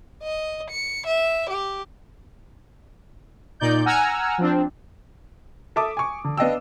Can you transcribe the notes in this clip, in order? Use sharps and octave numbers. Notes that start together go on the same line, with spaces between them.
D#5
C#7
E5
G4
A#2 D#4 D5 G6
F#5 G#5 A#5 E6 F6
F3 C4 D4
A4 E5 A5 D6 D#6
G#5 C#6
D3
B3 D4 D#5 F5 G5 E6